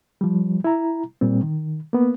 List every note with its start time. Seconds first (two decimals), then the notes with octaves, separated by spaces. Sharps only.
0.21 F3 G3
0.64 E4 A#5
1.21 A#2 G3 C4
1.43 D#3
1.93 A#3 B3